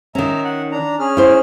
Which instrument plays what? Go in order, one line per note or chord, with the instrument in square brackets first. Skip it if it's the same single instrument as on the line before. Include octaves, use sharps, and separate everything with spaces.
[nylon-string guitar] D#3 C#4 [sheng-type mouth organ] E5 A#5
[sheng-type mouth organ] F#5
D4 A#5
C#4 G#4 F6
[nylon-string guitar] E4 C5